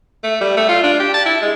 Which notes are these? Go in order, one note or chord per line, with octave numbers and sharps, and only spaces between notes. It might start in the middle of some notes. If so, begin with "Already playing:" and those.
A3
G3
A3
F4
D4
G4
A5
E4
G#3